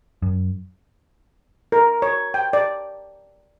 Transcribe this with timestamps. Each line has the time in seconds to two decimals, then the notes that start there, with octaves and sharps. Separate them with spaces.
0.22 F#2
1.72 A#4
2.02 C#5
2.34 G5
2.53 D5